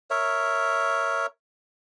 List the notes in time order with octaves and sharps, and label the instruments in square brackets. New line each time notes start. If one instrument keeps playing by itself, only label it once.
[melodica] A#4 C#5 E5